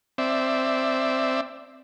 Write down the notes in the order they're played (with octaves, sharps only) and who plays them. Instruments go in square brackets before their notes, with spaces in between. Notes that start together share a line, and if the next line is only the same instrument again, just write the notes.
[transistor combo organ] C4 D5 E5